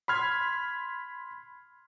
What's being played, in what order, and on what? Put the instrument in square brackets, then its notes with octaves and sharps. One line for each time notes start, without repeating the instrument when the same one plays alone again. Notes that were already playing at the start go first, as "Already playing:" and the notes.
[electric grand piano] B5 C6 F6 G#6